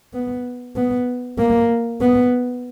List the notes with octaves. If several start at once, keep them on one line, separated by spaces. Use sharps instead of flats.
B3
B3
A#3
B3